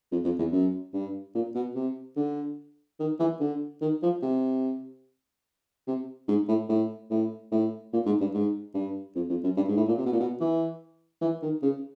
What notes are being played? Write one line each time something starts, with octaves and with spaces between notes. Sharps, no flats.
F2
F2
E2
F#2
G2
A#2
B2
C3
D3
D#3
E3
D3
D#3
F3
C3
C3
G#2
A2
A2
A2
A2
A#2
G#2
G2
G#2
G2
F2
F2
F#2
G2
G#2
A2
A#2
C3
B2
A#2
B2
E3
E3
D#3
C#3